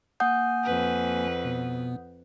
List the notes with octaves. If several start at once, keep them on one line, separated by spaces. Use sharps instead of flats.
A#3 F#5 G#5 D#6 G6
F2 B4
B2 B3